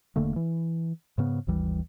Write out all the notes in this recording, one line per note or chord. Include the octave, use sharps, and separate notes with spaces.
E1 D3 A3 A#3
E3
G#2 C#3 B3
G#1 D#2 E3 G3